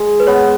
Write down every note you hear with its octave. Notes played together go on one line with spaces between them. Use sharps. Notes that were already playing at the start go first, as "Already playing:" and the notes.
Already playing: G#3
B4
B3 C#5